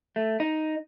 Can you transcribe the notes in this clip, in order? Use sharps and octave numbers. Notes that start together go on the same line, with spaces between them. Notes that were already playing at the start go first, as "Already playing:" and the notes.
A3
D#4